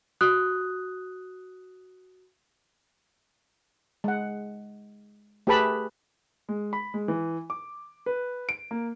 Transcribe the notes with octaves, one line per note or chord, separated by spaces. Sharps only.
F#4 D#6 F#6
G#3 F#5
A3 G4 G#4 B4 A5 B5
G#3
B5
G#3
E3
D6
B4
D7
A#3